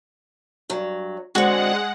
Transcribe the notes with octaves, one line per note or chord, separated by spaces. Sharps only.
G2 F#3
D3 G#3 C4 F#4 F#5